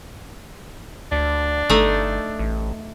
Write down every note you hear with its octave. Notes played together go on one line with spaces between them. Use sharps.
D2 D4
G1 A3 D#4
A1